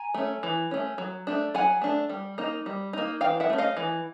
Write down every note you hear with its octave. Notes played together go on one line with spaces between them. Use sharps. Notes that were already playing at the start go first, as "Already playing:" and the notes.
Already playing: G#5 A#5
A3 C#4
E3
A3 C#4
F#3
A3 D4
F#3 F#5 G#5
A3 D4
G3
A#3 D#4
G3
A#3 D#4
E3 F5 G5
E5 F#5
A3 C#4
D#5 F5
E3